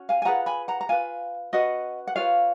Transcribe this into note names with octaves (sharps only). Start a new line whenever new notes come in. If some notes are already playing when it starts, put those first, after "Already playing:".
Already playing: C#4 F#4
F5 G#5
G#5
F4 G#4 B4 F#5 A#5
G#5 B5
F#5 A#5
A#5
F4 B4 F5 G#5
C#4 F#4 B4 D#5 F#5
F#5
F4 G#4 B4 C#5 F5